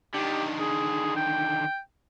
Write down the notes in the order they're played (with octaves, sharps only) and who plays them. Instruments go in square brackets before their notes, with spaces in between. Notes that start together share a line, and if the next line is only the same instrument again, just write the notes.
[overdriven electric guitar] D3 D#3 [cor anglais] G4
[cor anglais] G#4
G5